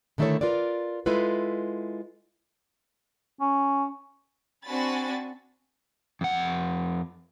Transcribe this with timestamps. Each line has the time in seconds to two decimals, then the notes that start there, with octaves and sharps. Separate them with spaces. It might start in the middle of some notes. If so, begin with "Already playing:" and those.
0.18 D3 D#3 A3 E4 A4 C#5
0.41 F4 A#4 B4 D5
1.06 G#3 E4 F4 A4 B4
3.41 C#4
4.65 C4 D4 F#4 G#5 B5 A6
6.21 F2 F#5